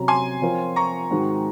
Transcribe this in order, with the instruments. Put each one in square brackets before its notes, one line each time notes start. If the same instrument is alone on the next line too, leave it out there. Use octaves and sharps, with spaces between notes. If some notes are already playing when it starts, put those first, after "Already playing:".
Already playing: [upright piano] C3 F#3 C#4 F#4 [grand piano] A#5
[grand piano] G#5 C6
[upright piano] F3 C4 F4 A#4 C#5
[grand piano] A#5 C#6
[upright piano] G#2 D#3 G#3 C4 F#4